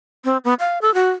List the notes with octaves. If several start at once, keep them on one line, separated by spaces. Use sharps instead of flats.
C4
B3
F5
A4
F#4